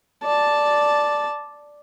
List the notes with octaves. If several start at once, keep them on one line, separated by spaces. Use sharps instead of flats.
D5 A5